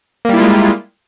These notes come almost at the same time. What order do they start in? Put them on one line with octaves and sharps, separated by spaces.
A#3 G3 E4 F4 G#3